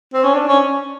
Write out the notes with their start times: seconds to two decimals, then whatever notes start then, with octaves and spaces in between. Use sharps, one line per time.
0.14 C4
0.24 C#4
0.34 D4
0.48 C#4